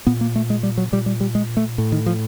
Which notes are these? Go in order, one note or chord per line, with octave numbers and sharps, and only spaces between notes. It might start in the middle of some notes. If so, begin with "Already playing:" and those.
A#2 B3
A#3
A3
G#3
G3
F#3
A#2 G3
G3
G3
G#3
A3
A2
D#3
F3